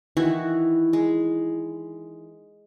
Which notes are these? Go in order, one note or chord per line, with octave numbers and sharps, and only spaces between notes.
D#3 E3 E4 F#4
G#3